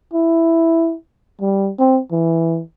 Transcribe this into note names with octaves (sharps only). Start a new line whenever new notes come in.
E4
G3
C4
E3